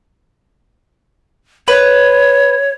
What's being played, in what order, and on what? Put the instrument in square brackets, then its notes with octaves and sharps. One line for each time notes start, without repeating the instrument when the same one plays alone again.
[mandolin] B4 [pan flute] C#5